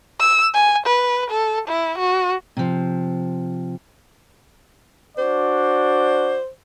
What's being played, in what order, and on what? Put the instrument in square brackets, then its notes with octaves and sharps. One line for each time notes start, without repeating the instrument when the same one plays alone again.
[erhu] E6
G#5
B4
A4
E4
F#4
[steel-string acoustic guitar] C3 F3
[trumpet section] D4 F#4 D5 [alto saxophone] C5